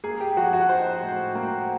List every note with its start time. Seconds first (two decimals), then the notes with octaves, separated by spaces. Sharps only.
0.04 A#3 G#4
0.20 G4
0.37 F3 F#4
0.53 F#4
0.69 D#4 C5
1.02 A2
1.35 A#3